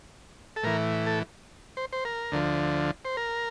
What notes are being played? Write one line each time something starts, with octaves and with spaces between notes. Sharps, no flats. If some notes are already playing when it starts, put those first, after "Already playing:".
A4
A2 E3 A#4
A4
C5
C5
A#4
D2 D3 F3
C5
A#4